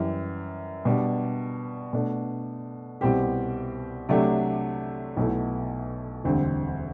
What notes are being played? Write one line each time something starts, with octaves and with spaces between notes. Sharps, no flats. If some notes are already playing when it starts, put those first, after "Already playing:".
Already playing: F#2 E3 G3
B2 G3 D4
B2 A3 D4
C2 B2 G3 C4 G4
C3 F#3 A3 D4 G4
B1 B2 A3 E4
E1 D2 D3 G3 C4